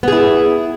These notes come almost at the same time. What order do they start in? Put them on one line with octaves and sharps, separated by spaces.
B3 G#4 E4